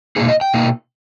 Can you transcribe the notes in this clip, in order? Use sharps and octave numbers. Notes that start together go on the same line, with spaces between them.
B2 A#3 D#4 G#4
D#5
G5
B2 A#3 D#4